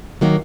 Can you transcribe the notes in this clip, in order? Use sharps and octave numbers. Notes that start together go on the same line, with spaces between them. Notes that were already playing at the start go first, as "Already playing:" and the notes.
D#3 F#3 A#3